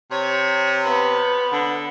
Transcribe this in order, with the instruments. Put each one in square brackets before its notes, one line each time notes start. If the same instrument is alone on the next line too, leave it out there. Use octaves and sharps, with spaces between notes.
[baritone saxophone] C3 [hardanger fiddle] C#5
[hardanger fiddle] B3
[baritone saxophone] D3